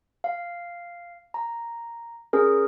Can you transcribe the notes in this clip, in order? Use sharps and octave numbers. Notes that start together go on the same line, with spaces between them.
F5
A#5
C#4 G#4 A#4